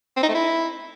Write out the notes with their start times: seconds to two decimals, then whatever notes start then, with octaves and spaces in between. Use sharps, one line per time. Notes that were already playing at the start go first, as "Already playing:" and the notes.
0.17 C4
0.23 D#4
0.29 A3
0.35 E4